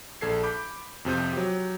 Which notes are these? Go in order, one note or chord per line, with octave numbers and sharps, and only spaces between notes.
A#1 A4 G#6 C7
B5 D6 G6
F2 C3 F3 G6
F#3 G4